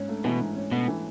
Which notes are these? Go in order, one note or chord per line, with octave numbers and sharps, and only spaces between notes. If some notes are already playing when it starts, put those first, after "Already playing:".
Already playing: G#2 C#4
A3
B2 E3 B3
G#2
C#4
B2 A3 B3
E3